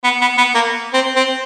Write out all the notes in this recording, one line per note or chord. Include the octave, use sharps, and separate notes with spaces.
B3
B3
B3
A#3
C4
C4